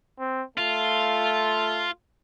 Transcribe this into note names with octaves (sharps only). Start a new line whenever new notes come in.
C4
A3 F4